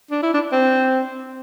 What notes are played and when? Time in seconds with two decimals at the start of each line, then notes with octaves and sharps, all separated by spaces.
0.11 D4
0.23 E4
0.34 D4
0.52 C4